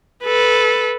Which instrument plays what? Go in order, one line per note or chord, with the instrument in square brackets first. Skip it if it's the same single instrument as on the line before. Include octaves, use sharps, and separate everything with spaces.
[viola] A4 B4